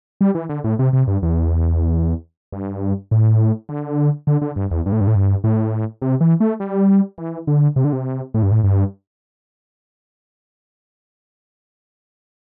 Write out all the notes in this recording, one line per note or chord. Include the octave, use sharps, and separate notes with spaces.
G3
E3
D3
A2
C3
C3
G2
E2
G2
A2
D3
D3
D3
G2
E2
G2
A2
G2
A2
G2
A2
C3
E3
A3
G3
E3
D3
C3
D3
C3
A2
G2
A2
G2